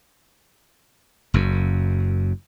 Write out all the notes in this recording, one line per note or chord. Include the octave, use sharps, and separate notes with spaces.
F#1 F#2